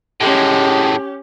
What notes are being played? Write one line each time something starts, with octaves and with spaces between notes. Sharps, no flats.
A2 G#3 C#4 G4